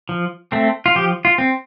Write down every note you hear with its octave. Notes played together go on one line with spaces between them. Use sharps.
F3
A3 C4
F4
F3 G4
F4
C4